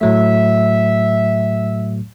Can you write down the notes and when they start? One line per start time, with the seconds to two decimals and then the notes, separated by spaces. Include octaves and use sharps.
0.01 A2 F#3 A3 E5